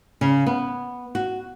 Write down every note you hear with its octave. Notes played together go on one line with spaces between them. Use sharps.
C#3
B3
F#4